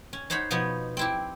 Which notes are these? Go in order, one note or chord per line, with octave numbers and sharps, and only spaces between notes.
C#4
D#4 C5 C#5 F#5 B5
B2 F3 B3 D#4 C#5
C4 E4 G4